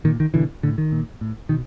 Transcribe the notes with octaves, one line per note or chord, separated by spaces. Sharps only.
A#2 D#3
D#3
B2 D3 E3
A2 D3
D#3
A#2
A2
B2 D#3